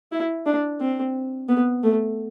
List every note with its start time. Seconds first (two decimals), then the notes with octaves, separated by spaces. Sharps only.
0.12 E4
0.46 D4
0.80 C4
1.49 B3
1.83 A3